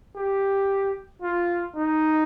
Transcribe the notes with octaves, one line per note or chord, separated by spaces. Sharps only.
G4
F4
D#4